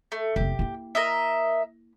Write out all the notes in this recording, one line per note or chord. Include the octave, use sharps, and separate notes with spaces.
A3
F1 B3 G4
A#3 E4
A#4 D#5 E5